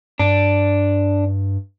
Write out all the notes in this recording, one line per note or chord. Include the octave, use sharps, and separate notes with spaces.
G2 D4